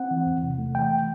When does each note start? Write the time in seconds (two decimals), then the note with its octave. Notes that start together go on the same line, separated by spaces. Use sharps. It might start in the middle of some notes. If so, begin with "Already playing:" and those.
Already playing: C4 F#5
0.11 E3
0.26 E2
0.43 C3
0.58 A3
0.75 E3 G5